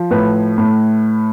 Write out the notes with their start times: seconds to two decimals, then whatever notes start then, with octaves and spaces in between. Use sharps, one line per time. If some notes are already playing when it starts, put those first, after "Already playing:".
Already playing: F3
0.11 A2 B4
0.58 A2